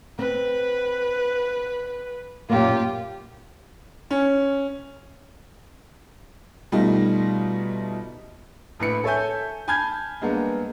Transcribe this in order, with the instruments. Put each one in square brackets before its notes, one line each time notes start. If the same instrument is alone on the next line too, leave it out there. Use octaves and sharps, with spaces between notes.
[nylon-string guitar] C4 [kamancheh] B4
[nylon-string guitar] F#2 A#2 A#3 [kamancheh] F4 G4
[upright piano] C#4
B2 G3 A3 D#4 F4
A#1 A2 E4 B4 B5 C#7
A4 C#5 E5 G#5 G6
G#5 A5 B5 F6 G6 G#6
G2 G#3 A#3 B3